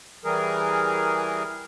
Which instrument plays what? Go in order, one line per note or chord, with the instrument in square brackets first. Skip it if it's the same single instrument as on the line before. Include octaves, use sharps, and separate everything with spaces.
[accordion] E3 G3 G#4 A#4